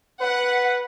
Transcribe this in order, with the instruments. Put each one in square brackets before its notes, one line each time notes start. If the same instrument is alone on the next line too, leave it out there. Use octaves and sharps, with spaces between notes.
[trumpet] B4 [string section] F#5